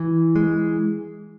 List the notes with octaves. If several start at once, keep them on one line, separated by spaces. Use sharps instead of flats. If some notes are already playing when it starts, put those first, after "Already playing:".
Already playing: E3
G#3